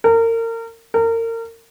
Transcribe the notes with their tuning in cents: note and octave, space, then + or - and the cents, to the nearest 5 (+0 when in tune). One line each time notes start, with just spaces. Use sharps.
A#4 -30
A#4 -30